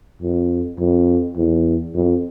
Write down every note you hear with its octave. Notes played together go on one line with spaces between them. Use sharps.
F2
F2
E2
F2